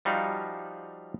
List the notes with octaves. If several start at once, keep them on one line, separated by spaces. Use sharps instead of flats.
F3 G3 D#4 F#4 F5